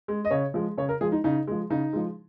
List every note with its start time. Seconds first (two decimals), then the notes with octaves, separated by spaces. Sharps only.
0.08 G#3
0.25 D#5
0.31 C#3 C#5
0.54 F3 G#3
0.78 C#3 C#5
0.89 A#4
1.01 F3 G#3 G#4
1.12 D#4
1.24 C#3 D#4
1.47 F3 G#3
1.70 C#3 D#4
1.93 F3 G#3